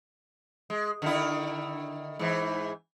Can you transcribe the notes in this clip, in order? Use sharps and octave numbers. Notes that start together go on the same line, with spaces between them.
G#3
D3 D#3 E4
G#2 E3